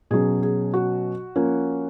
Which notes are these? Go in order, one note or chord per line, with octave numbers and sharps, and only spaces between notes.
B2 F#3 C#4 G#4
G#4
F#4
F3 A#3 C#4